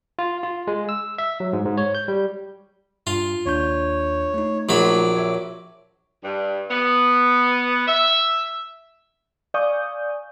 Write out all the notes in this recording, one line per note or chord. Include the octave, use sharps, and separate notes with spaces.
F4
F4
G#3
E6
E5
F#3
G#2
G#2
C#5
G6
G3
G2 F4
D#2 D4 C#5 G6
A3 D#4
A#1 F#3 B5 D6
C#5 E5
G2
B3
E5
D5 F5 G#5 C#6 D#6 G6